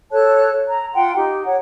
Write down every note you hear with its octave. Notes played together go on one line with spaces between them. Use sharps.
A4 C#5 A5 F#6
A#5
F4 F#5 G5 C6
D#4 G4
C#5 F#5